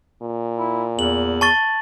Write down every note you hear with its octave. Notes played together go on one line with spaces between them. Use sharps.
A#2
E4
E2 F#7
A5 C#6 A6